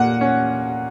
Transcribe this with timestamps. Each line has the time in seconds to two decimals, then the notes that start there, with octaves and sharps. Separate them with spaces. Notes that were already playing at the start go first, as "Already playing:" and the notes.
Already playing: A#2 A#3 F#5
0.21 C#4